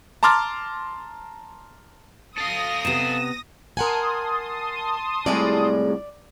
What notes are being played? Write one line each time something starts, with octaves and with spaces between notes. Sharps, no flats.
A5 A#5 C6 D6 F6 A6
A4 F5 D#6 A#6
C3 B3 E7
A#4 F#5 G#5 A5 C6 D#6
C2 A2 G3 G#3 G#4 D5